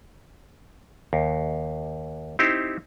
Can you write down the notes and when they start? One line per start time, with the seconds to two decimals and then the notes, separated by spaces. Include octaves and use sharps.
1.13 D#2
2.39 C4 D#4 E4 G4 C5